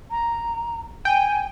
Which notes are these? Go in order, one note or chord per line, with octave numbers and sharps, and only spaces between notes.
A#5
G5 G#5